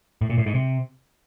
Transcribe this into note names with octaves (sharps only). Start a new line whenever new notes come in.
A2
A#2
A2
G#2
C3